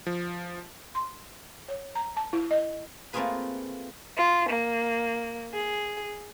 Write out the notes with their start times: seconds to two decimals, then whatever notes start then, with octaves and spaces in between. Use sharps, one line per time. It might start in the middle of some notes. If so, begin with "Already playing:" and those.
0.06 F3
0.95 C6
1.68 C#5
1.95 A#5
2.17 A5
2.33 E4
2.51 D#5
3.13 A3 A#3 C4 F4 G#4 B4
4.18 F4
4.50 A#3
5.54 G#4